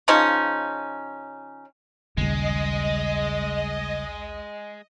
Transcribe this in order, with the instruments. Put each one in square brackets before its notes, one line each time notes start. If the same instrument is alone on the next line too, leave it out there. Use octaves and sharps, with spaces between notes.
[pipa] C#3 F3 C#4 D#4
[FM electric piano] A#1 D#2 [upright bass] C#3 G3 [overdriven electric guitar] G#3 [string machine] D#5